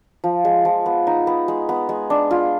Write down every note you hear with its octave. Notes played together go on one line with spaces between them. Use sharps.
F3
G#3
F3
B3
D#4
B3
G#3
B3
G#3
D4
F4